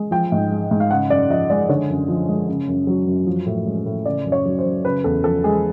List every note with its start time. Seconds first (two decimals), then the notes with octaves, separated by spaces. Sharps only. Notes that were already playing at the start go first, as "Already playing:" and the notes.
Already playing: G#3
0.11 F3 G5
0.32 G#2
0.51 G#3
0.71 G#2
0.80 F5
0.91 C#3 F#5
1.10 F#2 D5
1.29 F3 D#5
1.50 G#3 D5
1.69 D3 C#5
1.90 F#2
2.08 F3
2.28 G#3
2.49 C#3
2.68 F#2
2.87 F#3
3.07 F#2
3.27 F3
3.46 A2
3.66 G#3
3.86 A2
4.05 C#3 D5
4.25 F#2
4.32 C#5
4.45 F#3
4.59 C5
4.65 F#2
4.85 C#3 B4
5.04 E2 A4
5.24 F3 A4
5.44 G#3 G#4